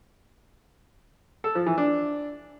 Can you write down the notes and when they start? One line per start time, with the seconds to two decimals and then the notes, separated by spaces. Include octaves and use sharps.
1.44 A4
1.55 F3
1.66 E3
1.78 D4